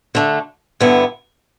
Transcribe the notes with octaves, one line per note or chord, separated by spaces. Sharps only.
D3 A3 D4
G2 D3 B3 E4